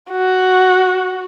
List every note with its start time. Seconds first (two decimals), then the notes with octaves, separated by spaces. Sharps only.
0.11 F#4